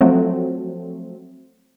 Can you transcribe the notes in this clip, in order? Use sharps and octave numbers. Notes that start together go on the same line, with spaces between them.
F3 F#3 A3 C4